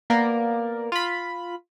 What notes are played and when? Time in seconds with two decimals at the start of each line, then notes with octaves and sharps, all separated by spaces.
0.10 A#3 B3 A#4 D5
0.92 F4 B5